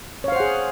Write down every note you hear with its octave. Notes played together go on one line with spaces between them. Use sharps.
G#4 C5 C#5 F5 F#5